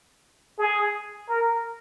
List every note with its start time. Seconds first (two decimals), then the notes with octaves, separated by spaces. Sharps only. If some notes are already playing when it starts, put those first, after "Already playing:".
0.58 G#4
1.29 A#4